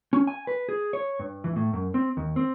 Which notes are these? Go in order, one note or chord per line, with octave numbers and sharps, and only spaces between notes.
C#4
G#5
B4
G#4
C#5
G2
E3
A2
F#2
C4
D#2
C4